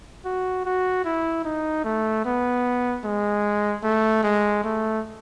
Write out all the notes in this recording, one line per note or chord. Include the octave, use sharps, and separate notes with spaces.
F#4
F#4
E4
D#4
A3
B3
G#3
A3
G#3
A3